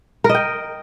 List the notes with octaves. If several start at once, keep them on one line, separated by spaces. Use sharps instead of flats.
A#4
D#5
G5